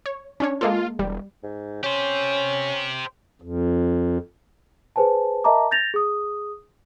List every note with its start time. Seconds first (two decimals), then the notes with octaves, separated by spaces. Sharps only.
0.06 C#5
0.40 C#4 D4 C#5
0.61 G#3 A#3 F4 A4
0.99 E1 G3
1.43 G#2
1.83 C#4 G4 C5
3.42 F2
4.96 G#4 B4 C5 G#5 A5
5.44 A#4 D#5 E5 A5 A#5 D6
5.71 G6 A6 A#6 F7
5.94 G#4 D#6